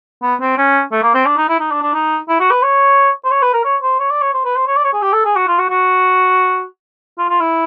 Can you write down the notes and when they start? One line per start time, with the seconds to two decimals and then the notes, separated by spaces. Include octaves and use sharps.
0.23 B3
0.41 C4
0.57 C#4
0.92 A3
1.03 A#3
1.14 C4
1.26 D4
1.37 D#4
1.49 E4
1.60 D#4
1.71 D4
1.82 D4
1.94 D#4
2.28 E4
2.40 F#4
2.51 B4
2.62 C#5
3.25 C5
3.31 C#5
3.42 B4
3.54 A#4
3.65 C#5
3.82 C5
4.00 C#5
4.11 D5
4.22 C#5
4.34 C5
4.45 B4
4.56 C5
4.67 C#5
4.77 D5
4.84 C#5
4.93 G#4
5.02 G4
5.13 A4
5.25 G#4
5.36 F#4
5.48 F4
5.59 F#4
5.70 F#4
7.18 F4
7.29 F4
7.41 E4